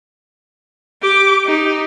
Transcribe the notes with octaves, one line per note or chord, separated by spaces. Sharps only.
G4 D6
D#4 G4